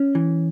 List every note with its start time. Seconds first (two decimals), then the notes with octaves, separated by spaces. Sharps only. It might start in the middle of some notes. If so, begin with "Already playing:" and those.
Already playing: C#4
0.15 E3